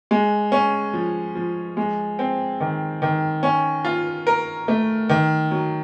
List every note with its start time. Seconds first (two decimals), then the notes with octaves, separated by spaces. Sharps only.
0.11 G#3
0.52 C#4
0.94 F3
1.35 F3
1.77 G#3
2.19 C4
2.60 D#3
3.02 D#3
3.43 C#4
3.85 F4
4.27 A#4
4.68 A3
5.09 D#3
5.51 F#3